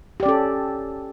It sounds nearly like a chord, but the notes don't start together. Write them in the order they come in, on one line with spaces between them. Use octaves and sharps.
G4 D5 C#4 A4